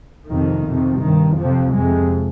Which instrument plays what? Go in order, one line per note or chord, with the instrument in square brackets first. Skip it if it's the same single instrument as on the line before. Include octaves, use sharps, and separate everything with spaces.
[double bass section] F2 C3 D#3
F2 C3
G2 D#3
F2 C3 F3
F2 C3 G#3